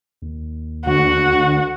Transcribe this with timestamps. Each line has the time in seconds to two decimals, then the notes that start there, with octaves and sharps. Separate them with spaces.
0.22 D#2
0.86 D2 F#4